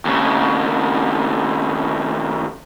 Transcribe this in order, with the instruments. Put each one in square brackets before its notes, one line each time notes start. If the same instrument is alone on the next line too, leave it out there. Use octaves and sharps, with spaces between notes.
[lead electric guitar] D#2 C#3